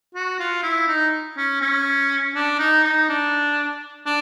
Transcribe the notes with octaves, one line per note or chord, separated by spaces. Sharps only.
F#4
F4
E4
D#4
C#4
C#4
D4
D#4
D#4
D4
D4